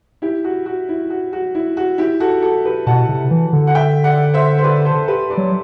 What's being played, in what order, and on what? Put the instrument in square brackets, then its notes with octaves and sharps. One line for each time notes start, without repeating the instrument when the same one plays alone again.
[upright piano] E4 G4
F#4
F#4
E4
F#4
F#4
E4
F#4
E4 G4
F#4 A4
F#4 A4
G4 B4
[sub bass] B2 [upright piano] F#5 A5
[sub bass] C3
E3
D3
[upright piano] F#5
E5 G5
D5 F#5
C5 E5
C5
B4 D5
A4 C5
G4 B4
B4 D5
[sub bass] F#3